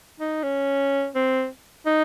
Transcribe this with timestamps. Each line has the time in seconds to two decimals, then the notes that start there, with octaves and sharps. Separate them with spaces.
0.19 D#4
0.43 C#4
1.15 C4
1.86 D#4